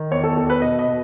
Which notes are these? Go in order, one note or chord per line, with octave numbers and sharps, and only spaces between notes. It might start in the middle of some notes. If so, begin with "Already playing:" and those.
Already playing: D#3
E2 C#5
A4
E2 A4
B4
B2 D#5
D#5
B2